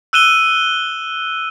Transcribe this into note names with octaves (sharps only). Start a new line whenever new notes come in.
E6 F#6 D#7 E7 G7